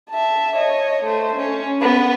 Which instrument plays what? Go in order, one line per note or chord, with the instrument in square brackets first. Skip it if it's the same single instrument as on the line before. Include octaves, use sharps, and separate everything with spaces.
[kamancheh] E5 A5
C#5 D#5
A3 C5
C#4
B3 B4